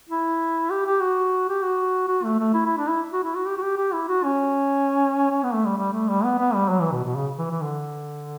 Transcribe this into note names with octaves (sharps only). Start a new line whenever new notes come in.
E4
G4
G4
F#4
G4
F#4
F#4
A3
A3
E4
E4
D4
E4
F#4
E4
F#4
G4
F#4
G4
G4
E4
F#4
C#4
C#4
B3
A3
G3
G3
A3
G3
B3
B3
G3
F#3
E3
B2
B2
C#3
E3
E3
D3